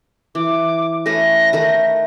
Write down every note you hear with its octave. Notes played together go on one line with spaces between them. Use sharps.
E3 D6
A3 C#4 B4 A#6
D#3 A3 B4